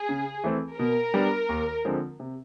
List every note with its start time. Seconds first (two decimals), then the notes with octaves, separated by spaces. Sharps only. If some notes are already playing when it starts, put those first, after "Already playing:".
Already playing: G#4
0.09 C#3
0.44 E3 A3 C4
0.79 B2 A#4
1.14 G3 B3 D4
1.49 D#2
1.85 D3 F3 G#3 C4
2.20 C3